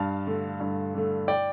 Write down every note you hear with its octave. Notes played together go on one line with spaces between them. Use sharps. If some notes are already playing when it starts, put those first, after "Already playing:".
Already playing: G2 F5 A5
D3 A3
G2
D3 A3
D5 G5